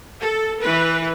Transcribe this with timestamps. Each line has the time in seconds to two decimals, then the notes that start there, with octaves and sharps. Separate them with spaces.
0.21 A4
0.62 E3 B4